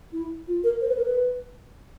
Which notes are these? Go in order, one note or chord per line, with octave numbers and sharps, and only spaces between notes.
E4
F4
A#4
C5
B4
A#4
B4